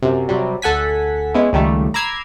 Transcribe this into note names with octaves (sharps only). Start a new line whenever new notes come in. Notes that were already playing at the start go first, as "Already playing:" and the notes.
F#2 C3
C3 F#3 G3
D2 A4 F#5 G#5 B6
G#3 B3 C#4 E4
C#2 D#3 G3 A3
A#5 B5 D6 E6 G#6 C7